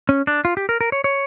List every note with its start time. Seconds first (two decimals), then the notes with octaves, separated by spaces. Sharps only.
0.09 C#4
0.27 D4
0.45 F4
0.57 G4
0.69 A#4
0.81 A#4
0.92 C#5
1.04 C#5